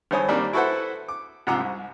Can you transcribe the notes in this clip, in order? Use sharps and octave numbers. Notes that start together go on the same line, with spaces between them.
G#1 G2 C5 C#5 G#5 D#6
D#3 G3 A#3 C4 D4
E4 F#4 A4 B4 C5 F#5
D6
G#2 C3 F3 F#5 A#5 D6
C2